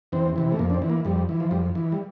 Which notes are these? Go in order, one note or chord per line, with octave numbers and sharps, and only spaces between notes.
E2 C4
C3 E3
A3
F2 A#3
D4
C4
E3
A#3
F2 G3
E3
F3
F2 G3
E3
G3